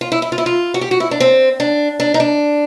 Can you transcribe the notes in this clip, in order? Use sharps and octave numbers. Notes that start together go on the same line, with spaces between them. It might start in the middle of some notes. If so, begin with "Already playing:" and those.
F4
E4
E4
F4
E4
F4
F#4
G4
F#4
E4
D4
C4
D4
D4
D#4
D4